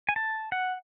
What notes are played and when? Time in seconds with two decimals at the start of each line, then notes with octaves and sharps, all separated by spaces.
0.09 G#5
0.16 A5
0.52 F#5